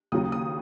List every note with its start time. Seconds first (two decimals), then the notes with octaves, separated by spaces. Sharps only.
0.12 D#2 C#3 F#3 D#6
0.32 D#6